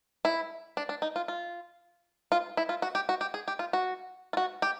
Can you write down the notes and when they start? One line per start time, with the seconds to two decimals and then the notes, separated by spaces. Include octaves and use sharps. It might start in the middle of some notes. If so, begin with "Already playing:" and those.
0.25 E4
0.77 D4
0.89 D4
1.02 D#4
1.16 F4
1.28 F4
2.32 F4
2.57 E4
2.69 F4
2.82 F#4
2.95 G4
3.09 F#4
3.21 G4
3.34 G#4
3.48 G4
3.59 F4
3.73 F#4
4.33 F4
4.37 F#4
4.62 G4